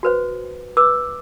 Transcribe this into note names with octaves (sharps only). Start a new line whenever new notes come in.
F#4 B4 C5
B4 D6 E6